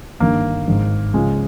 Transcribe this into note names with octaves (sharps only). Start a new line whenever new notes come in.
G1 G2 D#3 A#3
G#1 G#2 D#3
C#2 C#3 F3 G#3